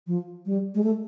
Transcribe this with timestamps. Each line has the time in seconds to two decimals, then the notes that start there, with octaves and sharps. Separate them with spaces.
0.07 F3
0.46 G3
0.75 G#3
0.84 A3